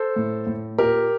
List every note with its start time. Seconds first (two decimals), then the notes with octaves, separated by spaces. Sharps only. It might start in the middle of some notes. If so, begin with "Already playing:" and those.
Already playing: A4 C5
0.16 A2
0.47 A2
0.78 A#2 G4 A#4